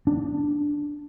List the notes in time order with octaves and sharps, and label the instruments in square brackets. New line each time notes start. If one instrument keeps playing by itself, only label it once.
[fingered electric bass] D4